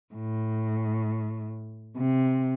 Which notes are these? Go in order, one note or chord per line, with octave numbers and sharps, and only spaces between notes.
A2
C3